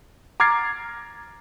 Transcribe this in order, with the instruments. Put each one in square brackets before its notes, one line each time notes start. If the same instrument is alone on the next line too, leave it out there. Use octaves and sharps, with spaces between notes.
[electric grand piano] A#5 D6 F6 G#6 A6 C7